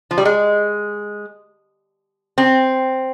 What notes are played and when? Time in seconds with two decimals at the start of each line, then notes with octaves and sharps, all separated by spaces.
0.11 F3
0.18 G3
0.25 G#3
2.38 C4